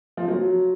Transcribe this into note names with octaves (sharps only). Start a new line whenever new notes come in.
F3
F#3